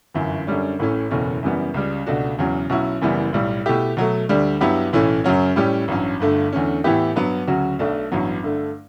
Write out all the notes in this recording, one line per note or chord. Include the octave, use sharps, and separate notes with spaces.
G1 F#2 E3
F#2 D3 G3 C#4
A1 A2 E3 A3 C#4
F#1 E2 B2 A3 C#4
F#2 C#3 E3 G3 B3
C#2 C#3 G3
C#2 B2 A3 D4 F#4
E1 E2 C#3 F#3
B1 B2 F#3 C#4 E4
F#1 F#2 E3 G3 B3
B1 A2 G3
B2 A3 E4 G4
B2 F#3 A3
D2 D3 G3 D4
G2 F#3 B3 E4 G4
B1 A2 E3 A3 C#4
F#2 C#3 F#3 C#4
A2 G3 C#4 G4
A1 G2 F#3 C#4
G1 G2 D3 A3
E2 D3 A3 C#4
A2 E3 B3 E4 G4
G2 F#3 B3
D2 C#3 F#3 C#4 F#4
B1 B2 A3 D4
A1 G2 F#3 B3
G2 D3 A3